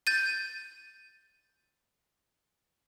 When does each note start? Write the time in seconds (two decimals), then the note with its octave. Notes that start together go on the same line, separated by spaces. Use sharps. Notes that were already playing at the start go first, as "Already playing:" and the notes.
0.07 G6 A6 D#7